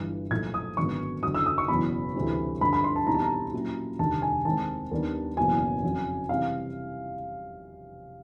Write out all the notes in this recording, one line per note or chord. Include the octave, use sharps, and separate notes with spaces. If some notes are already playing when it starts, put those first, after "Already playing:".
Already playing: G1 G2 E3
B1 A#2 F3 A3 G#6
D#6
G#1 F#2 D3 F#3 B3 C#6
F#1 F#2 D3 F#3 D#6
E6
D#6
C#6
F#1 E2 B2 F#3 B5
D2 C3 E3 G3 C4
G2 D3 F3 B5
B5
C6
A5
E2 B2 G3 C4 D#4 A#5
A5
A#5
A#2 F#3 A#3 C#4 E4
F1 D#2 D3 G3 A5
G#5
D#2 D#3 G#3 C4 A5
D#2 D#3 G3 B3 D4
F#1 E2 B2 F#3 A#3 G#5
F2 C#3 F#3
C3 E3 G3 C4 F5